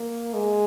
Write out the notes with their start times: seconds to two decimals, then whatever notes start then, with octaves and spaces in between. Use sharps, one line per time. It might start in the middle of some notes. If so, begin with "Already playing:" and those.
Already playing: A#3
0.34 G#3